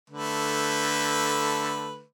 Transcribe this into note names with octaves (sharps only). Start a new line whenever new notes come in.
D3 A3 B4